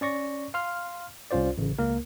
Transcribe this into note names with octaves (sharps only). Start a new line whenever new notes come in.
C#4 D5 C#6 A#6
F5 C6 F6
C2 C#4 F4 C5 D5
A1 C#3
C#2 A#3 A#4